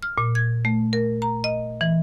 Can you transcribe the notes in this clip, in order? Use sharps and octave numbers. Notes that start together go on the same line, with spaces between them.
F6
A#2
G#6
A3
A#4
A#5
D#5
E3